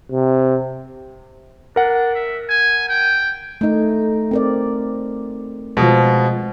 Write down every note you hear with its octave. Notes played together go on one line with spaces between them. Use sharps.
C3
D4 A#4 F#5
E5
G#5
G5
A3 D#4
C4 A#4 D5
B2 F3 G#3